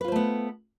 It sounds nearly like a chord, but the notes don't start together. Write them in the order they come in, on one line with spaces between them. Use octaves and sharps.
B4 F4 C5 A3 B3